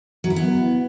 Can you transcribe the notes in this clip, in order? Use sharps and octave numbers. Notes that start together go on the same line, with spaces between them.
F#3
E4
B3